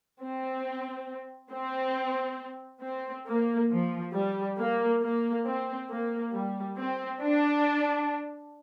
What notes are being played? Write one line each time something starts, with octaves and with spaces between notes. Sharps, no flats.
C4
C4
C4
A#3
F3
G3
A#3
A#3
C4
A#3
G3
C4
D4